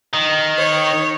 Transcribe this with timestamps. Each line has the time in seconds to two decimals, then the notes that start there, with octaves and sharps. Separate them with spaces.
0.14 D#3
0.58 C#5